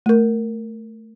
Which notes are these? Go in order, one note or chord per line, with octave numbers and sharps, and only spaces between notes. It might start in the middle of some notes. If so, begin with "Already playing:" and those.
A3 A#4